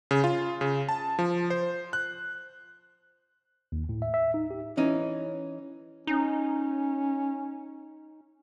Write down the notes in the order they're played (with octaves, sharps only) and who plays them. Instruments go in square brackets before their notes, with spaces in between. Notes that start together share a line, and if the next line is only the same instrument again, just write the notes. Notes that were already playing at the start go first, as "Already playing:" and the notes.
[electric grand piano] C#3
F4
C#3
A5
F3
C5
F#6
[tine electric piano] D#2
A2
E5
E5
D#4
G4
[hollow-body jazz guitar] E3 C#4 D#4
[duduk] C#4 [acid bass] D#4